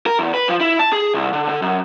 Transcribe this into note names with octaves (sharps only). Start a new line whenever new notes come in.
A#4
E2
B4
F3
E4
A5
G#4
C2
D3
D3
F#2